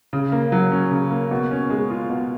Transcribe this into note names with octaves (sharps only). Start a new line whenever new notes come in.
C#3
A#3
F#3
C#4
C#3
A#3
B2
C#4
G#3
F4
B2